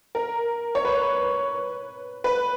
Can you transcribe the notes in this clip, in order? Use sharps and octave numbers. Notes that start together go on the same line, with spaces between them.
A#4
C#5
B4
B4